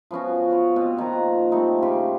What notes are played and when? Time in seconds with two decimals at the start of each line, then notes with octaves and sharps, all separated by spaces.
0.11 F3 B3 C#4 F#4
0.50 F4 C#5 F#5
0.76 B2 C4
0.97 A#2 D#3 F3 A#5
1.52 G3 A3 C4 D#4
1.82 C#3 F4 G4